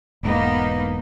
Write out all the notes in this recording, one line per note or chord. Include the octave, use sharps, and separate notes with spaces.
E1 G#2 A#3 B3 D#4